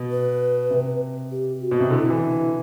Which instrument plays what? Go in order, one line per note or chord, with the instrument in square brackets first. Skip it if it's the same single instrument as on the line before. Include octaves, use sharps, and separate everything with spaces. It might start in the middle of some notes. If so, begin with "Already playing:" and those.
Already playing: [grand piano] B2
[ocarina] B4
[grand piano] C3
[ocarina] G4
F#4
[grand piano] B2
C3
[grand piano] D3 [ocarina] E4
[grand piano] E3